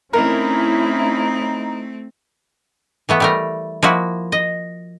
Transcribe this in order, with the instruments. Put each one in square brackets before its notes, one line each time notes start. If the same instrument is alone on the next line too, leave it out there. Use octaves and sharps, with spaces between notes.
[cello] A3 C4 [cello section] C#4 E4 [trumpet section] D#4 [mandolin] A#4
[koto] E3 A3 B3
G3 A3 A#4
F3 A#3 E4 F#4
D#5